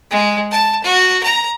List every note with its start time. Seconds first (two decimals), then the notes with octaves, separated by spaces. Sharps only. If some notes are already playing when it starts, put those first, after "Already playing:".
0.11 G#3
0.51 A5
0.84 F#4
1.24 A#5